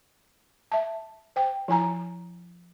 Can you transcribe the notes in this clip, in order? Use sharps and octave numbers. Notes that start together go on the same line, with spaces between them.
E5 A5
C5 G5
F3 E4 G#5 A#5